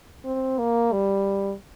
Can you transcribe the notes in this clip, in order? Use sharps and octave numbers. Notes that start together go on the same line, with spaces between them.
C4
A#3
G3